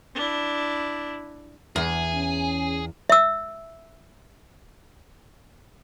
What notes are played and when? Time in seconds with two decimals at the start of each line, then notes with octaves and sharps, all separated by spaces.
0.15 D4 E4
1.76 E2 G#4
2.14 C#4
3.10 E5 E6